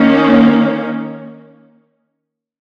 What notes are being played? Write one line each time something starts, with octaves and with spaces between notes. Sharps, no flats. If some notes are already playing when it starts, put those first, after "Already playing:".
Already playing: D#3 A#3 C#4